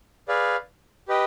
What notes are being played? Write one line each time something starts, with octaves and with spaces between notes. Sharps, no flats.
G#4 B4 D5 F5
G4 B4 D#5 G5